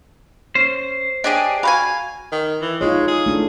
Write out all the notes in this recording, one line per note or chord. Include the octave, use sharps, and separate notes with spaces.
C#4 C5
D4 G4 G#4 C#5 D#5
F#4 F5 G5 G#5 B5
D#3
E3
G#3 D#4 F4 C#5
G#4
A3 D4 E4